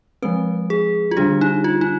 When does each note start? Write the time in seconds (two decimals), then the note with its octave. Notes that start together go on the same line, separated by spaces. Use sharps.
0.22 F3 G#3 C4 B4
0.70 G#4
1.11 F4
1.17 D3 G3 D4 G4
1.41 D#4
1.64 F4
1.81 D#4